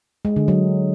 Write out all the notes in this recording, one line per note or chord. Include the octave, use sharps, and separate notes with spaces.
G#3
D3
F#3